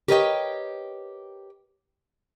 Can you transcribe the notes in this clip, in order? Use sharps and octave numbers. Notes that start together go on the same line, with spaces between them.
G4 A#4 B4 C#5 D#5 G5